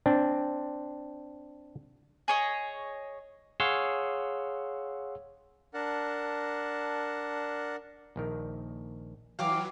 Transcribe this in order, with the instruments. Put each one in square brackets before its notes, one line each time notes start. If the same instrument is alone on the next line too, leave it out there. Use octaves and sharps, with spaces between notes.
[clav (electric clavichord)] C4 D4
[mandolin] G#4 C#5 D#5
[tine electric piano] G#4 C#5 F5 F#5 C6 E6
[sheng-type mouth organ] D4 A#4 F#5 A5
[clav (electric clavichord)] A#1 D#3 A#4
[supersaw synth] E3 F#3 [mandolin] F5 D6 [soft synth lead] G5